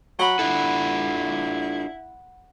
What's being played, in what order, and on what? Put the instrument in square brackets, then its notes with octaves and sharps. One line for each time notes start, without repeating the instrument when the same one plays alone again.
[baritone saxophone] F#3 [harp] F#5 B5
[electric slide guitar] D4 F4 A4 [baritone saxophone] E4